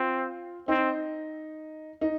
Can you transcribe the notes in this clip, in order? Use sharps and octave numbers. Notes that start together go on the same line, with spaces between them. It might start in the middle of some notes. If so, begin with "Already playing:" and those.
Already playing: C4 F4
C4 D#4
D#4